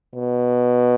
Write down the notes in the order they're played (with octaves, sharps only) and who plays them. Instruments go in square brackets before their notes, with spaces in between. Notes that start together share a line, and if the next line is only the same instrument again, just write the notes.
[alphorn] B2